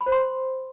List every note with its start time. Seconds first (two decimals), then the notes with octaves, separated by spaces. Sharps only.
0.01 B5
0.06 C5
0.12 C6